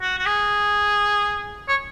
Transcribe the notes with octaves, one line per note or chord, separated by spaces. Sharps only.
F#4
F#4
G#4
C#5